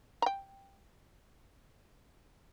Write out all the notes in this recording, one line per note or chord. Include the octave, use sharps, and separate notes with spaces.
G5 A#5